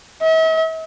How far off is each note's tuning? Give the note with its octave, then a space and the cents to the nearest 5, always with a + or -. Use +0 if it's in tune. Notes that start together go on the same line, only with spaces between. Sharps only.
E5 -45